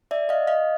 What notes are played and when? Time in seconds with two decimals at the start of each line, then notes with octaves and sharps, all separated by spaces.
0.11 D5 E5
0.29 D#5 F5
0.47 D#5 F5